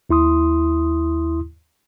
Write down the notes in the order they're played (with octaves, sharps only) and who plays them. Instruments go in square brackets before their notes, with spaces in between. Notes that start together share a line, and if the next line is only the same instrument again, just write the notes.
[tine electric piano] D#2 E4 C6 D#6